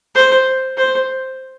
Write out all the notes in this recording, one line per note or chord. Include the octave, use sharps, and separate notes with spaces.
C5
C5